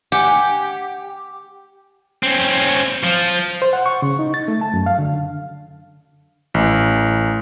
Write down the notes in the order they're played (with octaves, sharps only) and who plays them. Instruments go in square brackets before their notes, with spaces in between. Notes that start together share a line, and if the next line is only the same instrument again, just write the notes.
[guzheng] G4 [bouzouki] F#5 G#5
[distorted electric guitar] C4 C#4
F3
[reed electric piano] C5
F#5
C#6
C#3
D#4
A6
A3
A5
F#2
F5
D3
[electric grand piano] A1